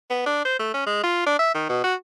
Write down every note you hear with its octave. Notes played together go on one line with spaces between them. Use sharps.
B3
D4
C5
A3
C#4
G#3
F4
D4
E5
D#3
B2
F#4